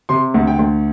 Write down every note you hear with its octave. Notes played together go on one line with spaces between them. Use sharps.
C3 C6
D2
G5
D2